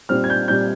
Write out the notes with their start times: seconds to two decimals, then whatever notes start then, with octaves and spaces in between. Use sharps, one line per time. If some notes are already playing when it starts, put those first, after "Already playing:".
0.09 A#2 G3 C4 F6
0.24 G#6
0.30 G6
0.48 A#2 G3 C4 G6